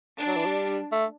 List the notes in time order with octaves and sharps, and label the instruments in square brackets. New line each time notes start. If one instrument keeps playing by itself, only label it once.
[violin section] D4
[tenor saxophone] F#3
E3
G3
A3